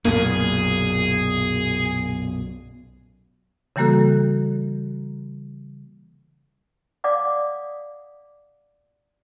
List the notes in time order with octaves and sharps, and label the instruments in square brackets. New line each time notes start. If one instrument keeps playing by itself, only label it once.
[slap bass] B1 F#2 A#2 [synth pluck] A#3 [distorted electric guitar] G#4
[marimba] C#3 E3 G3 A#3 F#4 A4
[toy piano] D5 F5 F#5 D6 D#6